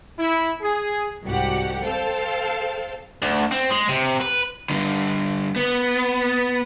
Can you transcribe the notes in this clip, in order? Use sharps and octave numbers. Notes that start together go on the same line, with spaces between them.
E4
G#4
C2 G#2 F#4 G4 F#5
A4 C5 F5 G5 A5
D2
C4
G#3
C3
B4
G2 D3
B3